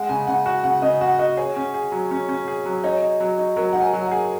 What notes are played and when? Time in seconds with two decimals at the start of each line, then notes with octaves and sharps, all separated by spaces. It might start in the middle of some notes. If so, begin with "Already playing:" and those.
Already playing: G#3 F#5
0.09 C#3 G#5
0.27 C#3 F#5
0.46 F#4 F#5
0.64 C#3 F#5
0.82 C#3 D#5
1.01 F#4 F#5
1.19 F#4 D#5
1.37 G#4 C#5
1.56 C#4
1.74 G#4
1.92 F#3
2.11 C#4
2.29 C#4
2.48 G#4
2.66 F#3
2.84 D#4 C#5
3.01 D#4
3.20 F#3
3.38 D#4
3.56 F#3 A#4
3.73 D#4 F#5
3.81 G#5
3.93 F#3
4.05 F#5
4.11 G#4